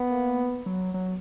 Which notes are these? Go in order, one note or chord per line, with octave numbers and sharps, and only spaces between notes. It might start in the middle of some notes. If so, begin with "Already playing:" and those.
Already playing: B3
A#3
F#3
F#3